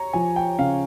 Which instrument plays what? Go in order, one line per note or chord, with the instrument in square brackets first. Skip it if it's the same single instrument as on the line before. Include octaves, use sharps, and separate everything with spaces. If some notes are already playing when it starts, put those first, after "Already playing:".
Already playing: [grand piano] C#5 A#5
[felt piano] F3 [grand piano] G#5
[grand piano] G5
[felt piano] C#3 [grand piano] F5